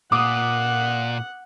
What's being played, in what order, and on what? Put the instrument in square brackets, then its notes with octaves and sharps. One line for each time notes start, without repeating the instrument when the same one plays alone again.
[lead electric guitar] A#2 [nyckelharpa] F#5 [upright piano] D6 D#6